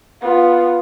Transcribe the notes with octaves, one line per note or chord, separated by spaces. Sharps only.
B3 F4